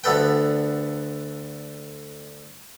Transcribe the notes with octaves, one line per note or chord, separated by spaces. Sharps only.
D2 D3 B3 A4 B4 G5